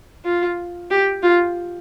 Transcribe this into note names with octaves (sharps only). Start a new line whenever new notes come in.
F4
G4
F4